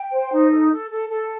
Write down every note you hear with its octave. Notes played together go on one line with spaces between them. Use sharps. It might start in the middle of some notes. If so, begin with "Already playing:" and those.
Already playing: G5
C5
D#4
A4
A4
A4
A4